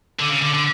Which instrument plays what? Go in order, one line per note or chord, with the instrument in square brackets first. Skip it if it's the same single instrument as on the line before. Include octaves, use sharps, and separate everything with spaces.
[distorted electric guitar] D3
C#3
D3
D3